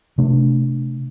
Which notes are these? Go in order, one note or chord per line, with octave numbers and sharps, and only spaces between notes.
C3 A3 D4